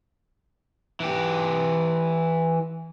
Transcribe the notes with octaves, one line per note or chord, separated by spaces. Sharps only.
E3 G4